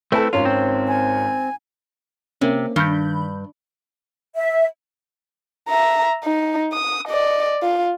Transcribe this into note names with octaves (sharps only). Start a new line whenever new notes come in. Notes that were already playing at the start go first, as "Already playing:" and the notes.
A3 C4 E4 A4 B4
G#1 C#4 F4
C4
G#5
C3 A#3 C4 C#4
G2 D#3 B5 G6
E5
E5 A#5
D#4
D#6
D5 D#5
F4